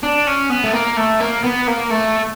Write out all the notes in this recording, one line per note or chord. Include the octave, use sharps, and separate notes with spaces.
D4
C#4
B3
A3
A#3
A3
A#3
B3
A#3
A3